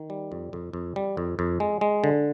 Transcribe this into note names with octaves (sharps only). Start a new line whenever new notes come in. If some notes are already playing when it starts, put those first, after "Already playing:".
Already playing: D#3
G3
F2
F2
F2
G3
F2
F2
G#3
G#3
D3